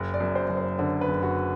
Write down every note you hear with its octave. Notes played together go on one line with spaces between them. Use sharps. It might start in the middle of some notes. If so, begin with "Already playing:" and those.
Already playing: F#1
D5
F#2
C5
F#1
C5
D3 C5
B4
F#1
F#4